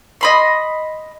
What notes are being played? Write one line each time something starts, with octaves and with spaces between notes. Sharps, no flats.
D#5 B5 C6